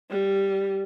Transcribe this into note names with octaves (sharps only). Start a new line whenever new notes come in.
G3